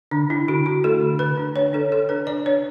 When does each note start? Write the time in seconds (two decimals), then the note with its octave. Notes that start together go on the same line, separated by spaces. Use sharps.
0.11 D3 D4
0.30 D4 E4
0.48 D3 F#4
0.66 D4 F#4
0.84 A3 A4
1.02 D3
1.19 D3 B4
1.37 D4
1.56 D4 C#5
1.73 D4 A4
1.91 D4 A4
2.09 D4 B4
2.27 D4 D5
2.46 D4 C#5